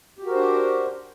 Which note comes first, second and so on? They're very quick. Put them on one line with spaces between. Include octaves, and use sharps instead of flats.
G4 F#4 A#4 C5 D4